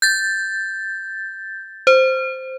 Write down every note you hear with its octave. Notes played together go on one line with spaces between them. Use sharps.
G6 A6
C5